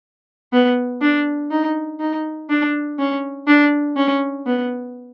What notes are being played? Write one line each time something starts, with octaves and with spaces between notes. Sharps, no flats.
B3
D4
D#4
D#4
D4
C#4
D4
C#4
B3